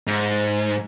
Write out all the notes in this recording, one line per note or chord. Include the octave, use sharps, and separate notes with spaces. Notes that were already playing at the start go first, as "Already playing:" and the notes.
G#2